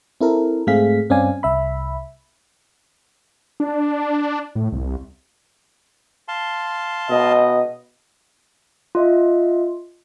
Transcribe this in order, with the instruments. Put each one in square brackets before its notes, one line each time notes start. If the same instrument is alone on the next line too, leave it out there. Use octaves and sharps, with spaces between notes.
[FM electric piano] C4 E4 A4 A#4
G#2 A3 C4 G#4 F5 B6
G2 C4 C#4 D5 F5 G#5
C2 E5 B5
[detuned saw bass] D4
A2
C2
[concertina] F5 A5 C6
[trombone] B2 [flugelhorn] D#5
[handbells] F4 D#5 E5